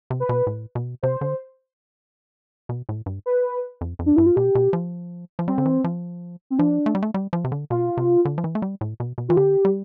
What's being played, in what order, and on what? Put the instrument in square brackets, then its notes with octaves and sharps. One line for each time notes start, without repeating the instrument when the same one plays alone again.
[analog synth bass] C3
[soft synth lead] B4
[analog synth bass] B2
A2
B2
[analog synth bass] C3 [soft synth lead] C5
[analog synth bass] D3
B2
A2
G2
[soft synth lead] B4
[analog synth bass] F2
F2
[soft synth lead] D4
[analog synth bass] G2 [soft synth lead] E4
[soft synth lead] F4
[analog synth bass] B2 [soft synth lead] G4
[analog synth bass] B2
F3
F3
[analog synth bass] G3 [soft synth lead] C4
[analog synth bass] D3
E3
F3
[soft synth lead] C4
[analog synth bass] F3 [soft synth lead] D4
[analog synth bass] A3
G3
A3
G3
F3
C3
D3
[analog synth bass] B2 [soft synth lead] F4
[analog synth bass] C3
D3
F3
E3
A3
G3
A2
B2
B2
[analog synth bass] E3 [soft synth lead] F4
[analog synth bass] D3 [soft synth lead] G4
[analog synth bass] G3